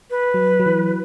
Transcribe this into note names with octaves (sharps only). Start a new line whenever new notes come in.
B4
F#3
F#3
E3